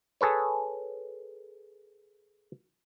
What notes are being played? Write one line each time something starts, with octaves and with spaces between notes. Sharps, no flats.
G#4 A4 B4 C#5